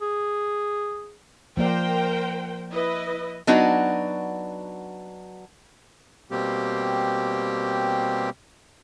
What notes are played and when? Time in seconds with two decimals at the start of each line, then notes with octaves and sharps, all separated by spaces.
0.01 G#4
1.57 F3 A#3 A#4 C5 D5 G5
2.71 E4 B4 D#5
3.47 F#3 B3 D4 D#4 F#4
6.31 B2 G3 A#3 C4 G4